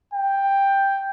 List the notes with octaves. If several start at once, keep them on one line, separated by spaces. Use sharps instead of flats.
G5